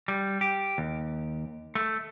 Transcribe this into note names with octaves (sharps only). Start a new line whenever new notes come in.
G3
G4
D#2
A3